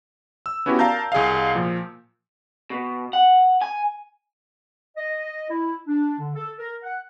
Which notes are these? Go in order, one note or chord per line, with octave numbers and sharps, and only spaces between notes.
E6
B3 C#4 E4 F#4 G4
A#4 D5 F5 A5 A#5 G6
C2 G#4 D#5 F5
A#2 F3
B2
F#5
G#5
D#5
E4
D4
D3
A4
A#4
F#5